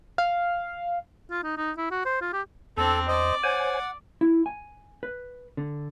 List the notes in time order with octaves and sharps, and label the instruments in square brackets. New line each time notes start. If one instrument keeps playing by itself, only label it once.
[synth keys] F5
[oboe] F4
D#4
D#4
E4
F#4
C5
F4
G4
[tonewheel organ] E2 [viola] C4 D4 [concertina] A4
[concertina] C5 D#5 [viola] D5
[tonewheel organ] C5 C#5 G#5 [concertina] F#5
[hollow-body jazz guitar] E4
G#5
B4
D3